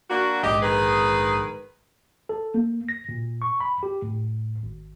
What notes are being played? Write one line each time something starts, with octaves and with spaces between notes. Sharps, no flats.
A#3 D4 F#4
A#1 G#2 G4 D#5
D#3 G#4 B4
A4
A#3
A#6
A#2
C#6
B5
G4
A2
G#1